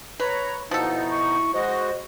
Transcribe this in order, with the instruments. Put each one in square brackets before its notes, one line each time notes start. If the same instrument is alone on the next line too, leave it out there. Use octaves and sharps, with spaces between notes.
[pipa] B4 [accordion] C#5 A#5
[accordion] B2 B3 D#4 [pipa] F3 A4 [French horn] E4
[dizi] C#6
[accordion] G#3 F#4 [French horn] C5 [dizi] D#5